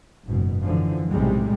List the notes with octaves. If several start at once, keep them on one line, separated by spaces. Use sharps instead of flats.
F#1 G#2 B2
F#2 D3 E3 F3
B1 A2 C3 G3 G#3